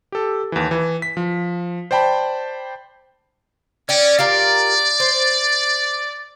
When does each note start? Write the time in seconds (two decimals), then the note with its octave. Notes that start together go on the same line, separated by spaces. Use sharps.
0.12 G4 A4
0.52 D#2 E3
0.71 E3
1.02 B6
1.17 F3
1.91 C5 D5 G5 A5 B5
3.89 C#4 D5 G5
4.19 F4 G4 A#4 D5
5.00 C5